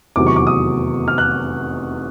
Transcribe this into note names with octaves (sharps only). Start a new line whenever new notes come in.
F1 E2 C3 D#3 F#3 D6
C#6
D6
D#6
F6
F#6